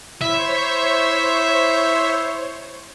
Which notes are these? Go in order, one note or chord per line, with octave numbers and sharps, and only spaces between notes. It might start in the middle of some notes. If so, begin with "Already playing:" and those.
E4 C5 C#5 E5